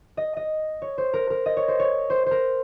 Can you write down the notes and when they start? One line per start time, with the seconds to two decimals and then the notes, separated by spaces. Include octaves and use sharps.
0.17 D#5
0.37 D#5
0.82 C#5
0.98 C5
1.14 A#4
1.30 A#4
1.46 D#5
1.57 C#5
1.68 C5
1.79 C#5
2.10 C5
2.26 A#4 C5